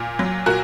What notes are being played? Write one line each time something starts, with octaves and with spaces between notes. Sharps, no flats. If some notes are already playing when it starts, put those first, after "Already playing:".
Already playing: A#2
F#3
A#2 F#4 A#4